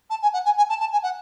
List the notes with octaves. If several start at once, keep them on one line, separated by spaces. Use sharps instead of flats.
A5
G#5
F#5
G#5
G#5
A5
A5
G#5
F#5